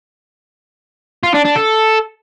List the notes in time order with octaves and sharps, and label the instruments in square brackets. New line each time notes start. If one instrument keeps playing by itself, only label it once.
[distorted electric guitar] F4
D4
D4
A4